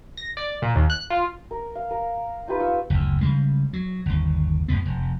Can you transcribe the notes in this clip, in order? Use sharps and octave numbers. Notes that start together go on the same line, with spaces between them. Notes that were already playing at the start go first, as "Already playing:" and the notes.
A#6
D5
A#2
D#2
F#6
F4
A#4
F5
A#4
D#4 F4 G4 B4
F4 C#6 E6
F#1 D2
C#3 G3 G#3
F#3
G1 D#2
F#2 A2 B3
F1